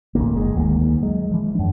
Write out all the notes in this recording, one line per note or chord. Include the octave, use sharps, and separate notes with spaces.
A1 D2 A#3
F#1 G#3
D2 D#3 E3 A#3
F#3 G#3
E3 F3
F#2 D4